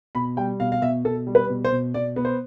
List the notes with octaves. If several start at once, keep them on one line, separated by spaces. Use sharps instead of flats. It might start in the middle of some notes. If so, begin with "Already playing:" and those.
B2 B5
G3 G5
B2 F5
F5
B2 E5
B2 A4
G3
B4
B2
C5
B2
B2 D5
B3
C5